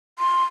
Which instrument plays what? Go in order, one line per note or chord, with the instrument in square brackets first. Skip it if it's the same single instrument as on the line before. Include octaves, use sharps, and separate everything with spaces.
[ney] C6